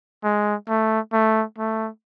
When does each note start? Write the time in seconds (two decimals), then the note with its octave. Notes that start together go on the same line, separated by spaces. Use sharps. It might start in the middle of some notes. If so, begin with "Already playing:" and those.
0.24 G#3
0.68 A3
1.13 A3
1.58 A3